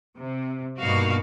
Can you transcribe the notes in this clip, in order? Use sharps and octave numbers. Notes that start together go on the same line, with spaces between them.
C3
G2 B2 A#3 D#4 F#4 F5